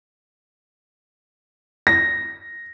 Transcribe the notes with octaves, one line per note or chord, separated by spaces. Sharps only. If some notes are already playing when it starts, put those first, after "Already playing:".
A#6